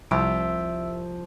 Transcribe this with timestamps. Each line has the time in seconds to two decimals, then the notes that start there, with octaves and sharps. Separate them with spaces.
0.11 C2 F3 E5 E6 D7